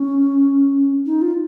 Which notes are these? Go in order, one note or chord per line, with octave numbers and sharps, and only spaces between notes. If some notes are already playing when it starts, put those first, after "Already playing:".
Already playing: C#4
D#4
F4